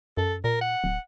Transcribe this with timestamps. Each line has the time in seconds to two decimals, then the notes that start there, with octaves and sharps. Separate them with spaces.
0.17 F#2 A4
0.44 A#2 A#4
0.61 F#5
0.84 D1